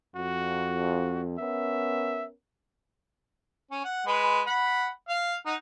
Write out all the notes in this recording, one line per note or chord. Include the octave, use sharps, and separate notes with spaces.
F2 F#4
B3 C#4 A#4 E5
C#4
F#5
G#3 B4
F#5 B5
F5
D#4 F#5